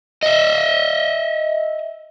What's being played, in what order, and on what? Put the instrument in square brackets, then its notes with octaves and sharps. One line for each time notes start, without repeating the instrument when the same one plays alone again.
[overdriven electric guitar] D#5 E5